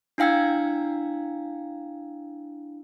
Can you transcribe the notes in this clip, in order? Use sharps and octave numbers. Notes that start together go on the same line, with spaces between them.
D4 E4 F5 G5 E6 G#6